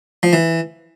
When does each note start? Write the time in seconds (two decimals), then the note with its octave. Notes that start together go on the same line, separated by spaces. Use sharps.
0.23 F3
0.33 E3